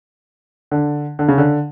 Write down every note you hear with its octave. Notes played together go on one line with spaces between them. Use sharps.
D3
D3
C#3
D3